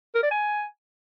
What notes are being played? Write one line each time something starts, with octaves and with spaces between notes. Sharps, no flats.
A#4
D5
G#5